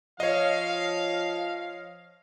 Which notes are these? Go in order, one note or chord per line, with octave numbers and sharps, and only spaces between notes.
F3 C#5 D#5 F5